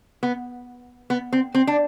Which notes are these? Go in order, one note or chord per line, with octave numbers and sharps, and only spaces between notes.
B3
B3
C4
C4
D4